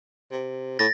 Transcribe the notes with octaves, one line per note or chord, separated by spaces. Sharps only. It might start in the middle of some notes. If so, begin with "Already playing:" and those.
C3
A2 A6 A#6